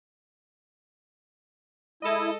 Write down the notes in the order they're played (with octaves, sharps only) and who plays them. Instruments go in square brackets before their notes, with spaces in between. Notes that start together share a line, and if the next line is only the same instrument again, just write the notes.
[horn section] G#3 A4 D#5 [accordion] E4